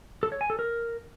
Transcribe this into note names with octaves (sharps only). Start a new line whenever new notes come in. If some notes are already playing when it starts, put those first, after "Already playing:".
A4
C#5
G#5
A4
A#4